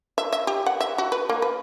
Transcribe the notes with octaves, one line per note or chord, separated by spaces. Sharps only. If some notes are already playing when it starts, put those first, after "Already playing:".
E5
E5
G4
F#5
E5
F#4
B4
A#3
B4